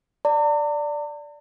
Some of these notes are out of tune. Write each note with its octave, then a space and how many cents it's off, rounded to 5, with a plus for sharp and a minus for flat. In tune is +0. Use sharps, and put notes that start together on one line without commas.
D5 +0 A#5 -45